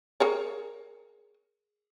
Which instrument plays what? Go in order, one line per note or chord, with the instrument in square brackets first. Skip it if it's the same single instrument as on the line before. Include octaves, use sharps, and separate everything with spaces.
[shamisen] G#4 A#4 C#5